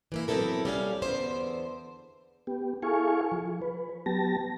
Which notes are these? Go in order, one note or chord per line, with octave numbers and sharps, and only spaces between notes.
E3 A#3 E4
F#3 B3 C4 E4 A4 A#4
G3 C#4 F5
E2 D3 B3 C5 E5
B3 G4
E4 G#4 A4 F5 G#5 C#6
F3
B4
F#3 B3 G4 A5 A#6